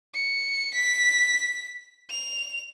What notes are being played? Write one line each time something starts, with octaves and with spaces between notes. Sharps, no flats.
C#7
B6
F7